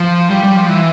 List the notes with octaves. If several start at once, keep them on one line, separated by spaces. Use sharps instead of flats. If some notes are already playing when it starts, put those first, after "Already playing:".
Already playing: F3
G3
G3
F3
E3